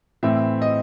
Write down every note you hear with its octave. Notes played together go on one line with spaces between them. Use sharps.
A2 E3 C4 E5
D#5